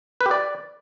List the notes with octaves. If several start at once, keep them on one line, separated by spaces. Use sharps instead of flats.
B4
G4
D5